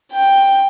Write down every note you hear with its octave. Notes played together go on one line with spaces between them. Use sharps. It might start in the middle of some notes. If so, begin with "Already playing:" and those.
G5